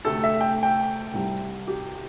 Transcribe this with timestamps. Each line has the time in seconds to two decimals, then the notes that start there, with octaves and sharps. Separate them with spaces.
0.05 D2 C3 A3 A4
0.24 E5
0.41 G5
0.63 G5
1.14 C2 C3 G3
1.67 G4